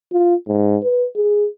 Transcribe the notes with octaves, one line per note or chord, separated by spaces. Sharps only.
F4
G#2
B4
G#4